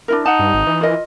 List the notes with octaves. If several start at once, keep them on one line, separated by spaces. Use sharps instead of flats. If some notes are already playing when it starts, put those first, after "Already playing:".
D4 E4 A#4
D#4 F#5 A5
G2
G#1
E3
F4 A#4 D#5